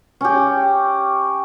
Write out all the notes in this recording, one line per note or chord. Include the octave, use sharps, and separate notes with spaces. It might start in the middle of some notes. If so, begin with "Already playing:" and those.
C#4 G4